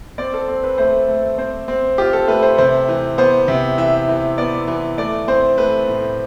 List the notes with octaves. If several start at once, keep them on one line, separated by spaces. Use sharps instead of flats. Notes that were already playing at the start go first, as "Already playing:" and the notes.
C4 D5
A4
C4
B4
A3 C5
A3
C4 C5
C4
F4 G4
A4
A3 B4
C5
C3 C5
E3
B3 C5
C3
E3 E5
E3
B3 D5
E3
A3 D5
C4 C5
A3 B4
A2